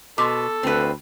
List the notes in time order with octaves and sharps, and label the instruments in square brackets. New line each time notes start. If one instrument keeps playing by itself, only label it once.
[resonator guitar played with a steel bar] B2 [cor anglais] A4 [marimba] C6 D6
[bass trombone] D2 [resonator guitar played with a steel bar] C4 B4